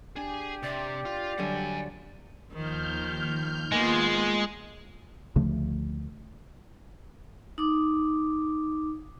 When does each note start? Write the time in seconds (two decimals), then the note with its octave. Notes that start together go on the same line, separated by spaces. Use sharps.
0.16 D4 G4 G#4 G#5
0.63 C3 D5
1.05 F4
1.38 G2 D3 F#3 F#5 G#5
2.52 D#2 D#3 F3 F6 G6
3.72 G#3 A#3 B3 F4
5.36 D2 C#3 F3 A3
7.58 D#4 D6